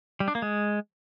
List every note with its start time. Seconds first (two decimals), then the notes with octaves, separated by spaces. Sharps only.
0.20 G3
0.28 D4
0.35 A#3
0.42 G#3